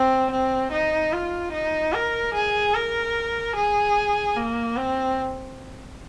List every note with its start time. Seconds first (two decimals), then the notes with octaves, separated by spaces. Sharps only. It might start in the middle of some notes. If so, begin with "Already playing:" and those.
Already playing: C4
0.31 C4
0.72 D#4
1.13 F4
1.53 D#4
1.93 A#4
2.34 G#4
2.74 A#4
3.56 G#4
4.37 A#3
4.77 C4